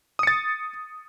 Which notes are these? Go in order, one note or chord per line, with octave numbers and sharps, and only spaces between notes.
D#6 A6 C#7